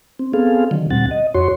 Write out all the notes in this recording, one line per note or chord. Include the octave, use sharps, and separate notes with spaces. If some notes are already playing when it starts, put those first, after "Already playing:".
C4
B3 C4 G#4 A4 F5
D3 D#3 F#3
D2 A#2 G3 C4 F#5 A6
D#5
F2 F#4 C#5 C6